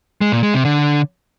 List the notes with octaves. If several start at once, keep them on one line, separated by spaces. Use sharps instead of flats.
G#3
A#2
G#3
C3
D3